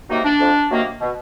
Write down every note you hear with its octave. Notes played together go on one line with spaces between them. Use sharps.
C3 D#3 F#3 A#3 D#4
D4
F2
C3 D#3 F#3 A#3
B2